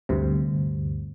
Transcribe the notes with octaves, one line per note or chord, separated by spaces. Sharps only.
D2 G2 C3